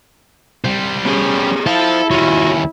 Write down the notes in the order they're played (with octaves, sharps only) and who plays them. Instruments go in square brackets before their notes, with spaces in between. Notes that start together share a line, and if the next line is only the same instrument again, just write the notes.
[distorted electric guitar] G3 C5
[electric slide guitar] B3 G4 G#4 [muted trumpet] C#4
[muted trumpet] E4 [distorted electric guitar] A4 [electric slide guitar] C5 F5
[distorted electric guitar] D#2 C#4 [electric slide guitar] F4 F#4